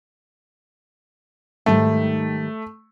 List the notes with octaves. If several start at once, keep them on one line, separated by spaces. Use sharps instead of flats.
G#2 D#3 G3 A3